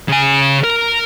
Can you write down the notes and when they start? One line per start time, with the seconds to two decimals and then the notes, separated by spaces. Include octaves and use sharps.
0.09 C#3 G#5
0.64 A#4